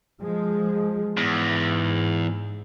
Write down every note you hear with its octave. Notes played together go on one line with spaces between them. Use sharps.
F3 G#3
E2 G#2